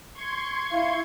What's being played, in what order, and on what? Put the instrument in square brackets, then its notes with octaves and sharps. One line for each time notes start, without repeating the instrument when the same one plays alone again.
[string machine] C6 C#6 G#6
[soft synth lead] E4 [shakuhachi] F5